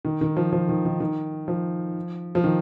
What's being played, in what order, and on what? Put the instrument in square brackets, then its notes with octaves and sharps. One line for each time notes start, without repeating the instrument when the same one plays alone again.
[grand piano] D#3
D#3
F3
F3
D#3
D#3
D#3
F3
F3
D#3